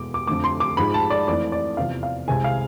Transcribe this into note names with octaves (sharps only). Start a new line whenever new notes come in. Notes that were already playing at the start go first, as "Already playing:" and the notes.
Already playing: E2 B2 G#3 D6
D6
F2 D3 A3 D6
C6
D6
G#2 F3 G#3 B5
A5
D5
F2 E3 A3 D5
D5
E2 C3 F3 F5
F5
C2 C3 G#3 G#5
F5